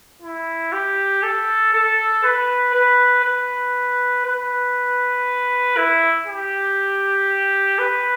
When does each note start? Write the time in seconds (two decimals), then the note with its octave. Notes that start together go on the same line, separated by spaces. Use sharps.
0.22 E4
0.72 G4
1.23 A4
1.73 A4
2.24 B4
2.74 B4
3.24 B4
4.26 B4
5.77 E4
6.27 G4
7.79 B4